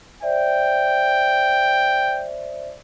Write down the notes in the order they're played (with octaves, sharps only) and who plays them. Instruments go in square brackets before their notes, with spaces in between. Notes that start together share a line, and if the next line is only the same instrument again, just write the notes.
[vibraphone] C5 D5 E5 [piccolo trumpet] G5